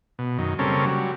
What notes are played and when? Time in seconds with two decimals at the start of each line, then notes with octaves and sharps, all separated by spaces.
0.19 B2
0.38 F#2 D#3
0.59 C#3 G3 A#3 C4 C#4 A4
0.86 F#3 G3